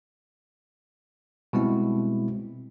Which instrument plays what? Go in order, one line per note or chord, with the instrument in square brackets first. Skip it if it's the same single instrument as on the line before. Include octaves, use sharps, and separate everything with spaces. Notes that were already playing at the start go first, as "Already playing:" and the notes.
[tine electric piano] B2 G3 G#3 C4 E4